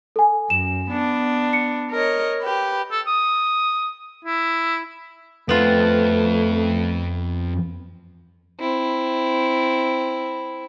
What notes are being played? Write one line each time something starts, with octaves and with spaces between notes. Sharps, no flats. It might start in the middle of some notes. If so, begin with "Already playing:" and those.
A4 G#5
F#2 E7
B3 D4
C#7
A#4 C#5 D#5
G4 B4
A4
D#6
E4
F2 A3 B3 F4
C4 E4